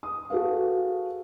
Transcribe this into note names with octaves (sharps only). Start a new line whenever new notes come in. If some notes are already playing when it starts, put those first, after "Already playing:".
D#6
F#4 G#4 A4 B4 F5